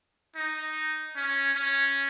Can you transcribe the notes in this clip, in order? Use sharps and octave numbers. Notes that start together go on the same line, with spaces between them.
D#4
C#4
C#4